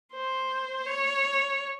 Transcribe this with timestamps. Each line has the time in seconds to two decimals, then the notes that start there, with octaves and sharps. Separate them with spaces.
0.13 C5
0.86 C#5